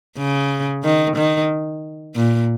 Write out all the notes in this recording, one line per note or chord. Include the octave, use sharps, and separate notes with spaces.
C#3
D#3
D#3
A#2